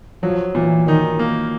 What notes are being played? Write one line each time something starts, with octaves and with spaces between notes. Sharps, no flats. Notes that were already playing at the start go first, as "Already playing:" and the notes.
F3 F#3
A#2 E3
D#3 D#4
A#3